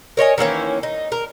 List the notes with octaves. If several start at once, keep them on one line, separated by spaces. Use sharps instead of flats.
A#4 C#5 D#5 G#5
D#3 E3 A#3 C#4
D#4
A#4